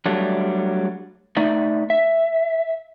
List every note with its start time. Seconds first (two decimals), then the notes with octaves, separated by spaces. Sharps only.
0.05 F#3 G3 A3 D4
1.37 A3 D#4 D5 E5
1.90 E5